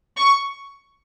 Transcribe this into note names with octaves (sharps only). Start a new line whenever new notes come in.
C#6